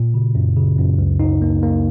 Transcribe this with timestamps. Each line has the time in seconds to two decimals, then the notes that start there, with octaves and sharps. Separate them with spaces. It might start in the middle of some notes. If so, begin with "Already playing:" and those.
Already playing: A#2
0.14 C#3
0.35 F#2
0.56 C#3
0.78 F#2
0.99 C#2
1.20 D#4
1.42 A#3
1.63 A#3